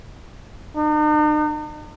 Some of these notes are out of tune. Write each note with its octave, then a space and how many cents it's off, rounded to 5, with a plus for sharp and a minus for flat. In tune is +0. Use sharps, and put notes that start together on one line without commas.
D#4 -45